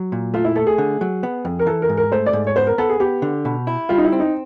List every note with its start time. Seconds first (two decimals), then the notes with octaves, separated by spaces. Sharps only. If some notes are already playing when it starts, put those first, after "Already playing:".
Already playing: F#3
0.12 A#2
0.34 A3 F4
0.45 E4
0.56 A3 A4
0.67 G#4
0.78 D3
1.01 F#3
1.23 B3
1.45 F2
1.59 A#4
1.67 E3 A4
1.82 A#4
1.89 G#2
1.97 A#4
2.12 A3 C5
2.26 D5
2.33 G#2
2.47 C#5
2.56 B3 C5
2.67 A#4
2.78 B3 A4
2.89 G#4
3.00 B3 G4
3.22 D3
3.45 B2
3.67 E4
3.89 G3 F4
3.98 D#4
4.04 E4
4.12 C4
4.20 D#4